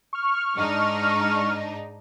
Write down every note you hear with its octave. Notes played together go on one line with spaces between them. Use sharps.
C#6 F6
G#2 D4 D#4